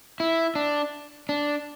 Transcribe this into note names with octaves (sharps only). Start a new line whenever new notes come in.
E4
D4
D4